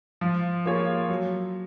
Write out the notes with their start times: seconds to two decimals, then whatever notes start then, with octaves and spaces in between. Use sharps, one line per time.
0.21 F3
0.65 A#3 F4 G#4 C#5
1.09 F#3